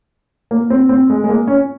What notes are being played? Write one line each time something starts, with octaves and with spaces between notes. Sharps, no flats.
A#3
C4
C4
G#3
G#3
A#3
C#4